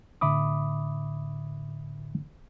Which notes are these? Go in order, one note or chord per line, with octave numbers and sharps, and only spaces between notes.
A2 D3 E5 B5 D6 D#6